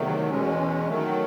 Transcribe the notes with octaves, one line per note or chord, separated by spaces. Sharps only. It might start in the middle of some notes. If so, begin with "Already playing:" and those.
Already playing: E2 C3 D#3 F#3 A3
E2 B2 G#3 C#4
D#3 F#3 A3